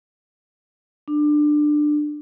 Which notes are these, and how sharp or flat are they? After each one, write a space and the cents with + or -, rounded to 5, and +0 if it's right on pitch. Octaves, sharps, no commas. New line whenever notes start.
D4 +20